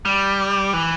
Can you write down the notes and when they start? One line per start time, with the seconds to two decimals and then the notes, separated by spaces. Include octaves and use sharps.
0.05 G3
0.73 E3